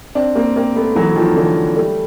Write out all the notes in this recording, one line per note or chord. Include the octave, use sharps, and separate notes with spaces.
C4 D4
A#3 C4
A#3 C4
A3 B3
E3 F#3
D#3 F3
D3 E3
G3 A3